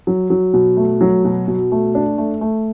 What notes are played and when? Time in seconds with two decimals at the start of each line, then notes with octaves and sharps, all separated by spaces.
0.07 F#3
0.30 F#3
0.54 B2
0.77 A3
1.01 F#3
1.25 B2
1.48 B2
1.72 A3
1.95 D4
2.18 A3
2.41 A3